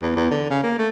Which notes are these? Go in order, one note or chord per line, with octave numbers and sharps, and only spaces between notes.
E2
E2
D3
C#3
A#3
A3